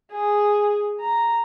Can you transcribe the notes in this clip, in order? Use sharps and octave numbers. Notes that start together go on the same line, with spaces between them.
G#4
A#5